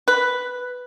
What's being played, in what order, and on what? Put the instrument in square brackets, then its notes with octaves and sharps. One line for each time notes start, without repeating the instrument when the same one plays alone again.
[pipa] B4